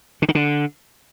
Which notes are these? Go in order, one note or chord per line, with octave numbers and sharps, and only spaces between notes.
D3
D#3
D3